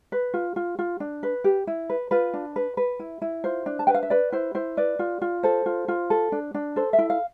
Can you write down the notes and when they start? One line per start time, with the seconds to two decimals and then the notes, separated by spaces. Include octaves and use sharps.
0.12 B4
0.34 F4
0.56 F4
0.79 F4
1.00 D4
1.23 B4
1.44 G4
1.67 E4
1.90 B4
2.11 F4 B4
2.34 D4
2.56 B4
2.77 B4
3.00 E4
3.22 E4
3.44 F4 C5
3.66 D4
3.79 A5
3.87 B4 G5
3.94 F5
4.03 E5
4.10 B4 D5
4.32 E4 C5
4.55 E4 C5
4.77 B4 D5
4.99 F4
5.22 F4
5.43 A4 C5
5.66 F4
5.88 F4
6.10 A4
6.32 D4
6.54 D4
6.76 A4 C5
6.93 E5
6.99 E4
7.10 F5